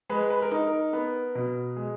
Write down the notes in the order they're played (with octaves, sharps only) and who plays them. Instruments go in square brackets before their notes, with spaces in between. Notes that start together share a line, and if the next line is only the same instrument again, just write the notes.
[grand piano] G#3 B4
B4
A#4
D#4
A#4
B3
B2
G#3